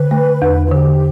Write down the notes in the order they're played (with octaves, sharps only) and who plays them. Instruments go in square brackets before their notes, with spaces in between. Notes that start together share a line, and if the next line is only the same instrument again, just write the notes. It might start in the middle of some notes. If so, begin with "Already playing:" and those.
Already playing: [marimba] D3 [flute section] B4
[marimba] A3
E2
[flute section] F4
[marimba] D3 [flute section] G4